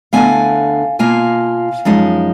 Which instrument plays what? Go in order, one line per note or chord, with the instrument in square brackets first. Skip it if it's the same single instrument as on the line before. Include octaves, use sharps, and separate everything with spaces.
[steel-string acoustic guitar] D2 D3 G#3 B3 F5 G#5
B2 A#3 F4 F5 G#5
F#2 F3 G#3 D#4